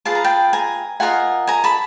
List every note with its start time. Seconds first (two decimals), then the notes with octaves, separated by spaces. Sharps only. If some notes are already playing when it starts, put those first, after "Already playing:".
0.05 F4 G#4 B4 A5
0.15 A#5
0.24 G5 A5
0.53 G#5 A#5
1.00 F4 A#4 D#5 F#5 G#5
1.47 G#5 A#5
1.64 A5 B5